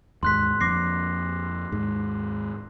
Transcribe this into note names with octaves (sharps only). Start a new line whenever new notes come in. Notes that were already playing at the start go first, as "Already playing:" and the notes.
D#2 G#2 C6 F#6 B6
F2 F3 A#3 D6 A#6 C7
D#2 G#2